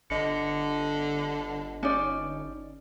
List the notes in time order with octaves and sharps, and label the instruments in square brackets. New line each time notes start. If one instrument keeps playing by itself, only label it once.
[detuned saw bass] G1 [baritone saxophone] D3 [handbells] D#5 C#7
[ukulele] C#4 D#4 D5